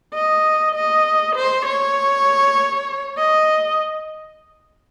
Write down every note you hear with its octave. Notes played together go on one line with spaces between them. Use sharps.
D#5
D#5
C5
C#5
D#5